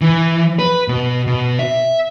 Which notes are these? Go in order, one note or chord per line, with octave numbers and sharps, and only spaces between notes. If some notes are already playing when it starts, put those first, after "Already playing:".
E3
B4
B2
B2
E5